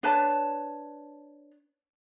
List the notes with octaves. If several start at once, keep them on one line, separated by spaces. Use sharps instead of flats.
D4 B4 C#5 A5